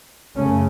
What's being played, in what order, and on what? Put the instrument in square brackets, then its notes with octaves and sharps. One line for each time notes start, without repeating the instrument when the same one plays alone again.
[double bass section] F#2 C#3 A3 C#4